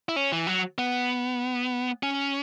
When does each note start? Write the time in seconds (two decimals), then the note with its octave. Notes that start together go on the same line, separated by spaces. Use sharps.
0.09 E4
0.16 C#4
0.32 E3
0.47 F#3
0.78 B3
2.03 C#4